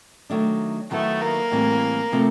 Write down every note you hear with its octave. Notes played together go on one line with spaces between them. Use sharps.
D#3 F#3 A3 D4
D#3 F#3 A3 B3 E4
A#3
A2 E3 G3 C4
C3 F3 A3 C4